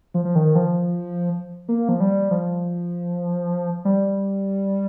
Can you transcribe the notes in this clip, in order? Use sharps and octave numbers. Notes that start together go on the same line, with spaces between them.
F3
F3
D#3
F3
A#3
F3
G3
F3
G3